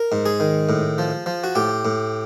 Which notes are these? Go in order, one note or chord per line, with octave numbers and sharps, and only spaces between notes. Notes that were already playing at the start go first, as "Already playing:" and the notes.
Already playing: A#4
G#2
G#4
D#3
A2
F3
F3
F#4
A2 G4
A2